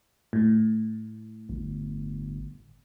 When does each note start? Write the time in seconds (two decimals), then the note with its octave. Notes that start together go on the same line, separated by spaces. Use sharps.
0.33 A2
1.49 G1